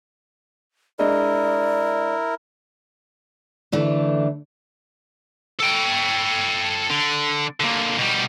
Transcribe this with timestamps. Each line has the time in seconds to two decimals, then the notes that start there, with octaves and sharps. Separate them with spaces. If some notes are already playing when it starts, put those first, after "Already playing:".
0.99 G#3 D4 E4 A#4 D5 D#5
3.72 D3 E3 A3 D4
5.60 A4 G5
6.90 D3
7.60 D3 A#3
7.99 B2 G3